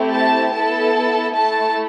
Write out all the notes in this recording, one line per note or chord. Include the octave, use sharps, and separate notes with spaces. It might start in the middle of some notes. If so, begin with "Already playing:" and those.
Already playing: A3 C4 E4 G4
A5
B3 E4 A4 A5
A3 E4 A4 A5